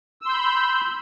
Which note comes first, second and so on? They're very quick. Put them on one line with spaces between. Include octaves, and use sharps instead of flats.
E6 C6 G6 B5